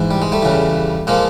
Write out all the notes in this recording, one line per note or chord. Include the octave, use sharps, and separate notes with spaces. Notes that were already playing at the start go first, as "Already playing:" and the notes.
Already playing: G#2 E3
G3
G#3
G3 A3
E2 C#3 E3
A#2 F3 G#3 A#3